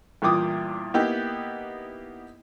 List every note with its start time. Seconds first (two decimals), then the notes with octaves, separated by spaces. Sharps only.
0.22 E2 G2 A#2 G5 D6 D#6
0.94 A#3 B3 D#4 E4 G4